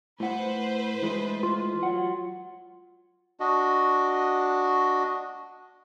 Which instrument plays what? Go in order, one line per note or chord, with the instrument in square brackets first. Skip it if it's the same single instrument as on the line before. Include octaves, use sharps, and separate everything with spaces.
[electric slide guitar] A2 F#5 [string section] B4 C5
[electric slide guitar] E3 G#3 A3
[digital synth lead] F4
[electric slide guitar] F#3 F#5
[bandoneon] D4 F#4 D#5